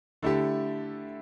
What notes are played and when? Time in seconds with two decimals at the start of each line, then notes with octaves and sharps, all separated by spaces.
0.22 D3 A3 E4 G4